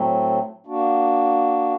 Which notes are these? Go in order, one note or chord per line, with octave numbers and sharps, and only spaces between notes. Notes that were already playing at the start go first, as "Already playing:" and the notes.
Already playing: A2 F#3 A3 C4
A#3 D4 F#4